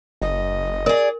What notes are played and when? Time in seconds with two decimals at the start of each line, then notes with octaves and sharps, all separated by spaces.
0.22 F#1 D#5
0.86 G#4 A#4 D5